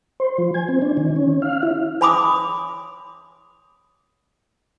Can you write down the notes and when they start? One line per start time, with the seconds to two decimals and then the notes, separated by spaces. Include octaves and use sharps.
0.20 C5
0.38 F3
0.54 G#5
0.68 C4
0.82 D4
0.97 D#3
1.16 C#4
1.42 F5
1.63 E4
2.01 C#5 G#5 B5 C6 D6 D#6